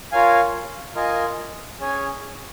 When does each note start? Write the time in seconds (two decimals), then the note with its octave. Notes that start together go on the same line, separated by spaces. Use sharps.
0.12 F4 A#4 C#5 F5 G#5
0.95 F4 A#4 D#5 G#5
1.80 C#4 G#4 C#5 G#5